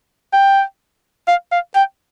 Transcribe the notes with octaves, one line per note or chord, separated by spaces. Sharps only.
G5
F5
F5
G5